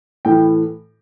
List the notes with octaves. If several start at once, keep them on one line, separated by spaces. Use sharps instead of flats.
A2 E3 G5